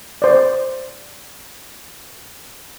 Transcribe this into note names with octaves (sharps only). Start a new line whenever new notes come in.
C5 D5